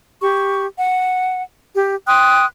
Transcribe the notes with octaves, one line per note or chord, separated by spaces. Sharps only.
G4 C#6
F#5
G4
G5 C6 D#6 F#6